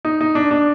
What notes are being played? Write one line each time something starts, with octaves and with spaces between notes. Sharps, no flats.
D#4
D#4
D4
D4